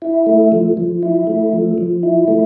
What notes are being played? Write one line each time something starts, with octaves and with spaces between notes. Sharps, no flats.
E4
A3
F3
F3
E4
A3
F3
F3
E4
A3